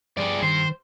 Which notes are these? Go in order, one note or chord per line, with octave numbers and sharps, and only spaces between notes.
G2 G4 G#4 D5
D#3 C5 C7